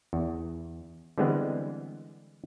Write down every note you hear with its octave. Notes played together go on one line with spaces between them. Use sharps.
E2
D3 E3 G3 G#3 B3 C4